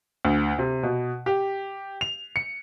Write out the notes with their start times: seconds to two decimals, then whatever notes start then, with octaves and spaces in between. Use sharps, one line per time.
0.25 D2
0.59 C3
0.83 B2
1.26 G4
2.01 F7
2.36 C#7